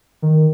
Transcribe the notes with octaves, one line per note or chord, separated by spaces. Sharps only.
D#3